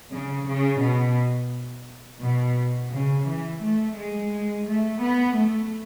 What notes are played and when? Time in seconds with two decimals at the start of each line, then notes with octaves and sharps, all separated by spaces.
0.12 C#3
0.46 C#3
0.81 B2
2.22 B2
2.92 C#3
3.27 E3
3.62 A3
3.96 G#3
4.67 A3
5.02 B3
5.37 A3